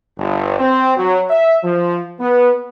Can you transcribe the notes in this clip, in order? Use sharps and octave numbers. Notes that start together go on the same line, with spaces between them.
G1
C4
F#3
E5
F3
B3